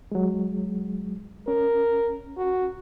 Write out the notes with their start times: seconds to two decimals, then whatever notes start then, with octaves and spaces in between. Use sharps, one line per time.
0.12 F#3 G#3
1.48 C#4 A#4
2.38 F#4